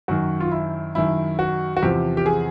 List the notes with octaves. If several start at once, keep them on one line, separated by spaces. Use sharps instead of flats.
F#2 D#3 F#4
F4
E4
F#2 D#3 E4
F#4
F#4
E2 C3 F3 G4
G4
G#4